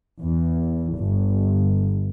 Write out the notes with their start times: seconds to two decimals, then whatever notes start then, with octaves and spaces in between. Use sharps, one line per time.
0.20 E2
0.95 G1